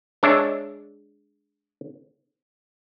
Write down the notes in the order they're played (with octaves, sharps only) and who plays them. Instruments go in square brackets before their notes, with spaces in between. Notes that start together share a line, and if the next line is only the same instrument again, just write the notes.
[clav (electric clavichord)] G#3 D4 C#5 D5 E5